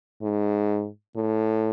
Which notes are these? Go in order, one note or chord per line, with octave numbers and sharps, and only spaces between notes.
G#2
A2